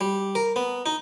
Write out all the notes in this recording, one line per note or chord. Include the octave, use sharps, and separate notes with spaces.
G3
A#4
B3
D#4